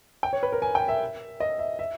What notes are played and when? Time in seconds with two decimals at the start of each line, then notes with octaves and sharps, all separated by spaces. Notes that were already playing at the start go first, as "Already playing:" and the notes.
0.23 G5
0.33 C#5
0.43 B4
0.52 A#4
0.62 G#5
0.75 G5
0.88 E5
1.40 D#5
1.59 E5
1.79 E5